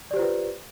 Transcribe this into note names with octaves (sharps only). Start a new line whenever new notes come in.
F4 G4 B4 C5 D5